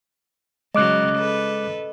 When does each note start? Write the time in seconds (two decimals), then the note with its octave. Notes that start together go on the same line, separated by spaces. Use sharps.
0.75 C#3 F#3 G#3 D#5 D6 F#6
1.18 A4 B4